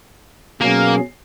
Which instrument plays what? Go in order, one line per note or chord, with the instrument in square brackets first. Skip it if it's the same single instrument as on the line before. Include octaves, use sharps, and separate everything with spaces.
[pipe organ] B2 F#3 C#4 G#4 [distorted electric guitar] A#3